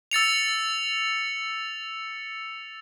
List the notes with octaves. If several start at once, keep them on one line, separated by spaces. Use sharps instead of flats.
E6 A6 C#7 F7